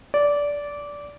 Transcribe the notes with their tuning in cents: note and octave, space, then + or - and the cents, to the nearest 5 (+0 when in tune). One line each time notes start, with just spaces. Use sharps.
D5 -15